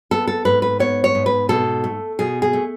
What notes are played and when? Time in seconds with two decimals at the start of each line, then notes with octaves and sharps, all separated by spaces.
0.11 B3 A4
0.27 A4
0.45 G#2 B4
0.62 B4
0.80 B3 C#5
1.04 C#5
1.15 G#2
1.26 B4
1.49 B2 A4
1.84 A3
2.19 B2 G#4
2.42 G#4
2.53 A3